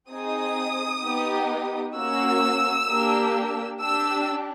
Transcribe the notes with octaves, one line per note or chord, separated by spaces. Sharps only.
C4 D#4 G#4 D#6
B3 D#4 G4
A#3 C#4 F#4 E6
A#3 D4 G4
D4 G4 E6